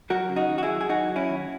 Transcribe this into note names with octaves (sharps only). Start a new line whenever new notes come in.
F#3 F#4 A#4
C#3
D#4 F#4
D#2
F#4
E4 G#4
F#3
G#4
F#3 D#4 F#4
F#3
C#4 E4
D#2